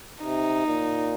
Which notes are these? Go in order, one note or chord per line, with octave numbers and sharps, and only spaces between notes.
C3 D#4
A#2